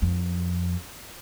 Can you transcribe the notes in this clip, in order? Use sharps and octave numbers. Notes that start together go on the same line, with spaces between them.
F2